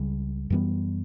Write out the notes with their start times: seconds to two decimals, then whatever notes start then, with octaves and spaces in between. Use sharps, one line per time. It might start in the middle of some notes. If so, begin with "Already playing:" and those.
Already playing: C#2 C#3 G3
0.50 F#2 E3 G3 B3